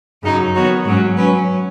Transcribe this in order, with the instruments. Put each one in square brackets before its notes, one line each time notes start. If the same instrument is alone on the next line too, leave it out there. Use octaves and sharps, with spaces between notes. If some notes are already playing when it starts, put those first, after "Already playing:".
[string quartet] F#2 C#3 F#3 D#4
D#3 B3 F#4 C#5
G#2 F#3 C#4
F#3 C#4 B4